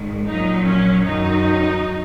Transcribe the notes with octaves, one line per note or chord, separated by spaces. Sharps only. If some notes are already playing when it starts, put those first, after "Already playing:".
Already playing: G#1 G#2 D#3
A#1 A#2 F#3 D#4
C#4
F#2 D#3 F#3 D#4